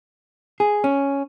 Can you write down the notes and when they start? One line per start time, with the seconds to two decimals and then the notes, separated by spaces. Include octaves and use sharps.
0.60 G#4
0.84 C#4